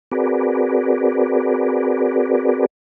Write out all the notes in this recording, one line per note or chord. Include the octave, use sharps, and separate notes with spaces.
C4 F#4 G#4 A#4 B4 D5